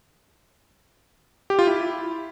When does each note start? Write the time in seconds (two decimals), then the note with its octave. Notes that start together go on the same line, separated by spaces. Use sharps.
1.50 G4
1.59 F4
1.67 E4